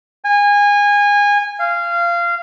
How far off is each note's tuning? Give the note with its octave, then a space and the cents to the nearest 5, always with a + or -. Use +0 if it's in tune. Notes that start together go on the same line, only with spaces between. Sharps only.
G#5 -25
F5 -20